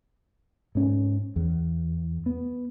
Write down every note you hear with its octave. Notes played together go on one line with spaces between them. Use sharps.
G#2 C#4
E2
B3